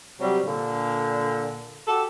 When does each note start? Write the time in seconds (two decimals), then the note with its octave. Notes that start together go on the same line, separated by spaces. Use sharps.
0.20 C3 F#3 G3
0.45 A#2 D3
1.87 F#4 G4 A4